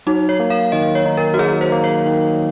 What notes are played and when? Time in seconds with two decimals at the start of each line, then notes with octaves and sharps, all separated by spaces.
0.07 F#3 D#4
0.29 C#5
0.40 A#3
0.50 F5
0.72 D#3 D#5
0.95 C#5
1.06 D#4
1.17 A#4
1.34 F#4
1.39 F#3 G#4
1.61 C5
1.72 A#3
1.84 C#5
2.06 D#3